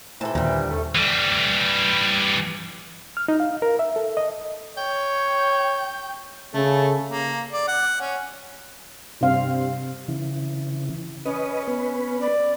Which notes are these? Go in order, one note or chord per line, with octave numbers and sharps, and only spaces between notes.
A2 C3 E3 A4 A5
D#2 A#2 D3 G3
A3
E3 G3
F6
D#4
F5
A#4
E5
A4
D#5
C#5 G5
C#3 A3 A4
A#3
D5
F#5
C#4
G2 C3 C4 F5
C#3 E3
C#4 B4 D#5
B3 B4
D5